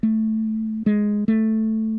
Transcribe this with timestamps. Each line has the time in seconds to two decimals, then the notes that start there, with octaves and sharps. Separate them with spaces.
0.03 A3
0.86 G#3
1.28 A3